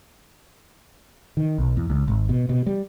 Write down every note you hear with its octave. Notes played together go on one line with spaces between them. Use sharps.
D#3
B1
E2
C#2
G#1
B2
B2
G3